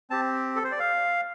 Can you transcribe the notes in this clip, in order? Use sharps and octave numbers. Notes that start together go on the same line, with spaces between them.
C4 G4 A5
A4
C5
D5
F5